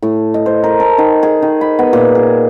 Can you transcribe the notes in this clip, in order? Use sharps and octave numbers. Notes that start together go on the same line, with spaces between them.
A2
D#5
C5
A#4
A4
D#3
G#4
D#3
B5
B3
A#2
G#4